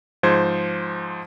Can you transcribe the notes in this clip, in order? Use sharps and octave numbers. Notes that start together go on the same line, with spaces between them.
G#2 F3 C5 G#6